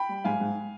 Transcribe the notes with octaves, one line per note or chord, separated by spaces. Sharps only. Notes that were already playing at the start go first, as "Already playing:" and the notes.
Already playing: G5 B5
G3
G#2 F5 G#5
G#2